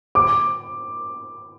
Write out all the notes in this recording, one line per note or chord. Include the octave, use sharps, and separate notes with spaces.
D6